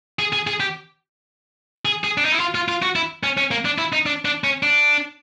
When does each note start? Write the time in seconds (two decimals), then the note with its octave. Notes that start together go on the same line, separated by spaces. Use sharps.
0.19 G#4
0.33 G#4
0.47 G#4
0.60 G4
1.85 G#4
2.04 G#4
2.18 D4
2.25 D#4
2.32 E4
2.40 F4
2.55 F4
2.68 F4
2.82 F#4
2.96 E4
3.23 C#4
3.37 C#4
3.51 A#3
3.65 D4
3.78 E4
3.93 D#4
4.06 D4
4.25 D4
4.44 C#4
4.63 D4